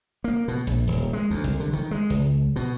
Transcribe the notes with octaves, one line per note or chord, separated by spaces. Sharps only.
A#3
B2
A#1
D#1
G#3
D2
C2
D3
D#3
G#3
C#2
B2